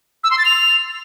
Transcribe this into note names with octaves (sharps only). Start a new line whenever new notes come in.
E6
C6
A6
F7